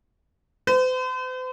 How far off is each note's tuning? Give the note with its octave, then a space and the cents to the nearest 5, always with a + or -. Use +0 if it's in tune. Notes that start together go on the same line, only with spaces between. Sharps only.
C5 -45